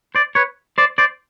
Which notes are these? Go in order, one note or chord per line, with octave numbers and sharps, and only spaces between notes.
C5 D5
B4 C#5
C5 D5
C5 D5